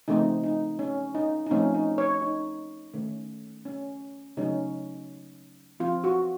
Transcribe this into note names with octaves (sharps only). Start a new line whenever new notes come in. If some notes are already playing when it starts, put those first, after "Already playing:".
C#3 F3 A3 C4 D#4
D#4
C#4
D#4
D#4
F3 A3 C4 C#4
D#4
C#5
D#4
D#3 A3 C#4
C#4
C#3 F#3 A3 C#4 D#4
F3 C4 F4
F#4